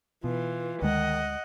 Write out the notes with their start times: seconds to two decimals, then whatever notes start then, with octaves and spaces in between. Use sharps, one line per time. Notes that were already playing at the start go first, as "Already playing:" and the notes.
0.24 B2 E3 F4
0.82 D2 D#3 G#3 D#5 F#5